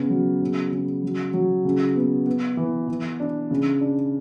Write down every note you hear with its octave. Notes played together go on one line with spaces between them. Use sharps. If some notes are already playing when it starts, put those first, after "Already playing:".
Already playing: C#3 B3
F#3
C#3
C#3
F#3
F#3
C#3
B3
B3
E3
E3
D4
C#3
D4